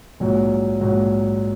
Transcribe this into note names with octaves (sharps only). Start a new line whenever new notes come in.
A#1 G#2 F#3
A#1 G#2 F#3